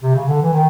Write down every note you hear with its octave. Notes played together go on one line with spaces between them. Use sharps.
C3
C#3
D3
E3
D#3